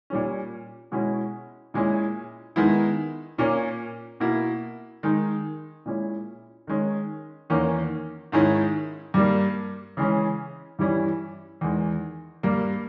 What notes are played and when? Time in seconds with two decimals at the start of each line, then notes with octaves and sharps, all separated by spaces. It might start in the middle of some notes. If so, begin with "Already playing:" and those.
0.10 A#2 G3 C#4
0.92 B2 G#3 C#4 E4
1.74 A#2 G#3 C#4 E4
2.56 D#3 G#3 B3 E4
3.38 A#2 A#3 C#4
4.20 B2 A#3 E4
5.03 D#3 G#3 D#4
5.86 A#2 G#3 C#4 E4
6.67 D#3 G#3 C#4
7.50 E2 D#3 A#3 C#4
8.32 G#2 D#3 G#3 C#4 E4
9.14 G2 G3 A#3
9.97 C#3 E3 G#3 C#4
10.79 G2 E3 G3 C#4 E4
11.61 E2 D#3 G#3
12.43 G2 G3 A#3